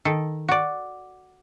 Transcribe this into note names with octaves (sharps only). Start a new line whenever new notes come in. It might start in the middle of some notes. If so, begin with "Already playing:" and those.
D#3 A4
F#4 D5